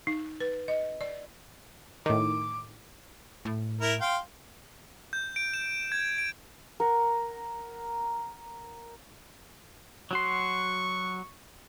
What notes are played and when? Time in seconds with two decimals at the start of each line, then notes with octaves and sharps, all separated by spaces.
0.07 D#4
0.40 B4
0.68 D#5
1.01 D5
2.06 A2 D#3 D6
3.45 A2
3.81 E4 A#4
4.01 F5 G5 C6
5.13 G6
5.36 D7
5.54 E7
5.92 G#6
6.18 D7
6.80 A#4 F#5
10.11 F#3 F#4 C6 C#6